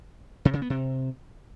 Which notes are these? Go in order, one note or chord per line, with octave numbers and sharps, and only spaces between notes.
C3
C#3
B3
C3